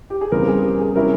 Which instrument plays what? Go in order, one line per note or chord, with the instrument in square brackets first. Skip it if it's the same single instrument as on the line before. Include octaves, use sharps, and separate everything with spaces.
[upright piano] G4
G#4
E2 C#3 G3 C4 A#4
G#4
G4
G#4
C3 G3 C#4 E4 A#4